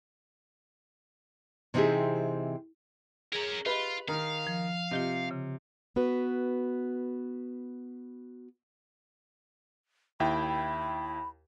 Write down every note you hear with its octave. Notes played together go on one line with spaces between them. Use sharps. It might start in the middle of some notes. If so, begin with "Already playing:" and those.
C3 E3 C4 D#4 G4 G#4
C#4 G#4 A#4 A#5
F4 G4 B4 D#5 B5
D#3 D#4 F5
F3
C3 F4 G4 D#5
C#3
B3 F#4 B4
D#2 E4 G5 B5